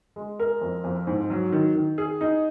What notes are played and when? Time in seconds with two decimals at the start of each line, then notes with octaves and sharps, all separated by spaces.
0.16 G#3
0.40 A#4
0.61 F2
0.84 F2
1.07 G#2
1.30 F#3
1.52 D#3
1.75 D#3
1.98 G#4
2.21 D#4